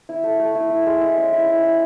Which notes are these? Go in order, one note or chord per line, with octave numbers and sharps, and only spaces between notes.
E4
A3
A3
E4
E4
G#3
E4
C#4
E4
E4
E4